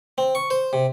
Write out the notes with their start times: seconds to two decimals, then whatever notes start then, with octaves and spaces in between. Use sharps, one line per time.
0.18 C4
0.35 C#6
0.50 C5
0.73 C3